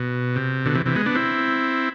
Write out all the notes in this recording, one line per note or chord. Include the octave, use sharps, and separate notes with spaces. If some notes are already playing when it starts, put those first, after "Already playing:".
Already playing: B2
C3
B2 D3
C3 E3
C3 E3
G#3 B3
B3 D4
C4 E4